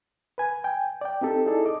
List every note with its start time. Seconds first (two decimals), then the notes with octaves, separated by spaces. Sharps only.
0.38 B4 G#5
0.64 G5 G#5
1.01 D5 G5
1.21 C4 D#4 G4 A4
1.46 D#4 E4 G#4 A4 D5
1.66 D#5 D6